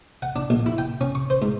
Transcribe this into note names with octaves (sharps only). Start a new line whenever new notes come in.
F#5
D4
A#1
E4
G5
C#4
C#6
C5
G#2